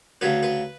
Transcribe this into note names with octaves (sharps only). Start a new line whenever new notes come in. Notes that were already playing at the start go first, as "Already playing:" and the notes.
D2 C#3 F#3 B4
B4